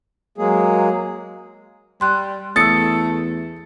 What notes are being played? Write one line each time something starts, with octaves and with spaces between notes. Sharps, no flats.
F#3 G#3 A#3 G#4
G3 C6 F#6
E2 A3 D#6 E6 A6 C#7